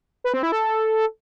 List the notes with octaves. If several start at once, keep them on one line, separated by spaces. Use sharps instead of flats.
B4
C4
E4
A4